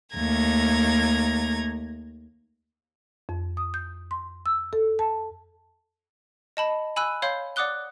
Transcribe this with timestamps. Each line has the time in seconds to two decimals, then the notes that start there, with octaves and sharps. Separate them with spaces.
0.14 D#2 A3 A#5 G#6 A#6
3.29 F2
3.57 D#6
3.74 G6
4.11 C6
4.46 E6
4.73 A4
4.99 A5
6.57 D#5 A5 B5
6.96 G#5 B5 E6 F#6 D#7
7.22 C#5 F5 B5 C6 G6
7.56 D5 F#5 D6 D#6 F#6 G7